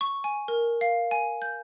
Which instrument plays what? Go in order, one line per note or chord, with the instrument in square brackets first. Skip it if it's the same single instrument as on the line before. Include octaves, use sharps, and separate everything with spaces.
[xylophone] C#6
G#5
A#4
F5
G#5
G6